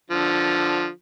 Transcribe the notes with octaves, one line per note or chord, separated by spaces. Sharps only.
D3 F3